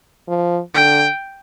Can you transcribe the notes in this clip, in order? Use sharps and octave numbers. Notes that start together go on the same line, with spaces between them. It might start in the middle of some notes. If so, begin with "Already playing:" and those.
F3
D3 G5